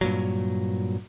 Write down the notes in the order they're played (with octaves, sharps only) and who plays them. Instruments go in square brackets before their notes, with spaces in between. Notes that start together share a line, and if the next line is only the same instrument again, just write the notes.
[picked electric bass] G2 A#2 F#3